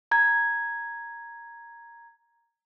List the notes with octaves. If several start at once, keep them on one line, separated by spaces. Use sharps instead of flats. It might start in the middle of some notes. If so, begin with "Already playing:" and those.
A#5 G#6